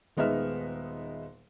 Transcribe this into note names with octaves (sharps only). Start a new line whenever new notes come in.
D#1 G#3 B3 D#4 E5 F6